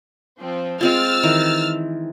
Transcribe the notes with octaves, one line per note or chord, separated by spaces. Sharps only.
F3 C4
G#3 C4 F4 E6 F6 A6
D#3 E3